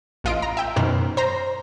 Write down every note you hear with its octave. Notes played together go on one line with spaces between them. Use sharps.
A1 F4 D#5 D7
A#5
E5 G5
F#2 B2 D#3 A#4 C5 F6
C5 A#5 A#6